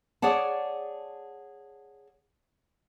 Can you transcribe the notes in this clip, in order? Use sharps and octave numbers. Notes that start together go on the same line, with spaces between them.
G#4 C#5 D5 F#5 A5